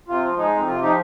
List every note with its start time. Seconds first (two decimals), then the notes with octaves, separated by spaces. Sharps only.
0.08 C3 F4
0.23 F3
0.37 G#3 D#4
0.52 F2
0.67 C3 F4
0.82 F3 D#4 G4